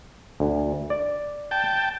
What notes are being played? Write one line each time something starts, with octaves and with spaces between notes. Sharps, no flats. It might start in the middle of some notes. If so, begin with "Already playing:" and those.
D2
D5
G5 A5